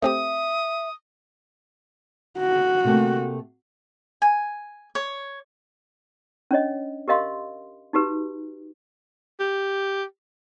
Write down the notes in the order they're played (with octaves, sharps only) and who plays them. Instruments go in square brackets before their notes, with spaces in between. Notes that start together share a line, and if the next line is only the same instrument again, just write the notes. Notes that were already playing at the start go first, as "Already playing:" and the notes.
[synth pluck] A3 C4 G4 [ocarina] E5 [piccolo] D#6
[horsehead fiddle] F#4
[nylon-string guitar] C3 A3 A#3
[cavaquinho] G#5
C#5
[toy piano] C#4 D4 C#5 D#5
G4 A#4 D#5 F5 C6
D#4 F#4 G4 B4
[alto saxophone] G4